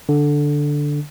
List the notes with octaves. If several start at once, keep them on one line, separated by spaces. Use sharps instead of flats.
D3